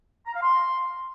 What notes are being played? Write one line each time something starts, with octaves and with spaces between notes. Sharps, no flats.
A#5
F5
C6